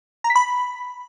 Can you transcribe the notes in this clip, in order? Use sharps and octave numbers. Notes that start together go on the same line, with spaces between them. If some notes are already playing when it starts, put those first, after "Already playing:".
A#5
B6
B5